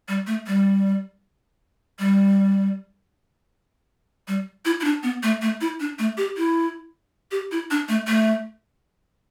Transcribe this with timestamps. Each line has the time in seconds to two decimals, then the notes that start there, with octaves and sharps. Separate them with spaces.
0.08 G3
0.27 A3
0.47 G3
1.99 G3
4.28 G3
4.65 E4
4.80 E4
4.84 D4
5.03 B3
5.23 A3
5.42 A3
5.61 E4
5.80 D4
5.99 A3
6.17 G4
6.37 E4
7.31 G4
7.52 E4
7.71 D4
7.88 A3
8.08 A3